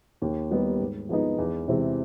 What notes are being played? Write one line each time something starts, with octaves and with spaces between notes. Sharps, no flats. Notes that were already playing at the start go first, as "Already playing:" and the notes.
D#2
D#3 G3 B3 D#4
G#2
F3 G#3 B3 D#4
E2
C3 E3 G#3 C4